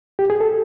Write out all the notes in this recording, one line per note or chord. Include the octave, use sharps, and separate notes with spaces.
G4
G#4
A4